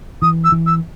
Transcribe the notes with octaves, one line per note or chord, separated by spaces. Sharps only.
E3 D#6
E6
E3
E6